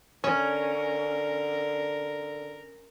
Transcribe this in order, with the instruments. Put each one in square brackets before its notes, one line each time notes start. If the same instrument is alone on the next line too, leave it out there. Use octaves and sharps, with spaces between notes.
[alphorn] D3 [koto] C#4 [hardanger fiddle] A#4 [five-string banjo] C#5